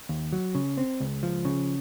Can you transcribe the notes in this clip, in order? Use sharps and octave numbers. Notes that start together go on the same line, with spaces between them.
D#2
F#3
C#3
C4
C#2
F3
C#3